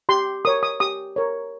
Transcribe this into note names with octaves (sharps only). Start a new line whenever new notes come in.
G4 C6
A#4 C#5 D#6
D#6
G4 D#6
A#4 C#5